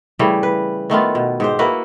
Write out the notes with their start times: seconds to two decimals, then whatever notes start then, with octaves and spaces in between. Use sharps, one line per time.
0.19 C#3 E3 G3 A3
0.43 B4
0.90 D#3 A3 B3 F4
1.15 B2
1.40 G#2 G4 C5
1.59 A#3 E4 F#4 B4